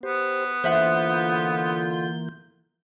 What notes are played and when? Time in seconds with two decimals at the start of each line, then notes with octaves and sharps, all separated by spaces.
0.03 B3 G4 C5
0.64 D3 E3 A#3 F4 C5 E5 F#5 G6